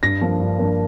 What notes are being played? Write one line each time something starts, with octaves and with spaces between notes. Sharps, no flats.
G2 A#6
F3 A#3 D4
G2
F3 A#3 D4